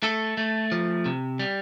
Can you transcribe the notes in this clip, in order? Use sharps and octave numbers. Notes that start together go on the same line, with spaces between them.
A3 A4
A3
F3
C3
G3